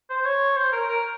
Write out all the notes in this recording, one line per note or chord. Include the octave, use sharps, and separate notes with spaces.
C5
C#5
C5
A#4
A#4